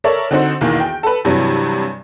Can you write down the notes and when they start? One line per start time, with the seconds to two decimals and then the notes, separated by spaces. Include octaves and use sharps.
0.04 A4 A#4 C#5 D5 E5
0.31 D3 C4 D#4 F#4 C5
0.61 B1 E2 D#3 E3 A#3
0.80 G5
1.03 A4 B4
1.25 G2 C3 E3 F#3